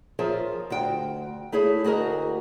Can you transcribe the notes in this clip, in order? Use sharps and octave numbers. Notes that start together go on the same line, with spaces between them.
F3 F4 G#4 A#4 C#5 E5
D2 F#4 G5
A3 E4 G#4 C#5
D2 F#4 G#4 A#4 D#5